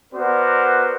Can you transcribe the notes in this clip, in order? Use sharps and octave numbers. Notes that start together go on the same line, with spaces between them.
B3 F#4 A#4 C5 D5